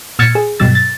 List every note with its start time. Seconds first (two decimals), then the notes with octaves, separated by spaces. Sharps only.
0.19 A#2 E6 F6 G#6 A6 C#7
0.35 G#4
0.60 G2 B2 F#3 E6 A6
0.75 A6